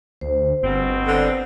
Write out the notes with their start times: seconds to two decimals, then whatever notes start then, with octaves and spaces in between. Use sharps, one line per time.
0.21 D2 C5
0.63 G1 B2 C4
1.06 D3